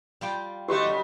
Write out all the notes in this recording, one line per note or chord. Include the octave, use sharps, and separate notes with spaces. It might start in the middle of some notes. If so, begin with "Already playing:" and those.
G3 F4 G5
D3 A3 D#4 F#4 G4 C#6
F#2 A2 C#3